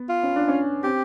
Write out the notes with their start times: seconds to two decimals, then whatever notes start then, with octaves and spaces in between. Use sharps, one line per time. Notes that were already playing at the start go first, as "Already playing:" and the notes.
Already playing: B3
0.09 F4
0.23 C#4
0.36 D4
0.48 C#4
0.83 C4 G4